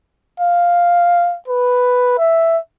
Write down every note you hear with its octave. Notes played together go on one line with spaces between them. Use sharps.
F5
B4
E5